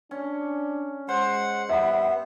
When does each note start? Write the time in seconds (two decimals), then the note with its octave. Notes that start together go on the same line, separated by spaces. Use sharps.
0.11 C#4 D4
1.09 G#3 C5 F#5
1.69 G3 B3 E5 F#5 B5